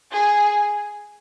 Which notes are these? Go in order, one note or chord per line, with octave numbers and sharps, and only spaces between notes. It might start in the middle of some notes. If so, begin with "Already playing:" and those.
G#4